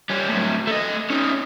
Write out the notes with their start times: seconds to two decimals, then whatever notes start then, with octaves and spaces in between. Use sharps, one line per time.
0.10 G3 C#4
0.29 A2 F#3
0.67 A3 D#5
1.10 C#4 D#4